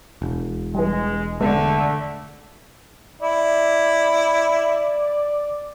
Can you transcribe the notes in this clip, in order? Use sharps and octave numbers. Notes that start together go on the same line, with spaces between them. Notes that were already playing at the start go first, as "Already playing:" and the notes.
E1
E3 G3 G#3
D3 G#3 A3 B3
E4 D5